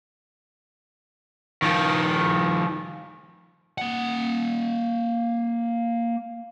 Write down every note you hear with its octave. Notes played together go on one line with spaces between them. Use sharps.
D#3 F3
A#3 F#5